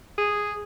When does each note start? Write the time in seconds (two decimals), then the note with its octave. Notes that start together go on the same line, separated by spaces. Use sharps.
0.18 G#4